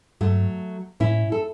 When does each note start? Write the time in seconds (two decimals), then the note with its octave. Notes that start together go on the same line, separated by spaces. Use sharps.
0.21 G2 F#3 A3
1.00 A2 C#4 E4
1.32 A4